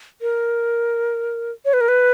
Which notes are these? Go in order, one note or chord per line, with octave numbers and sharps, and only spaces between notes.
A#4
C#5
B4
A#4
B4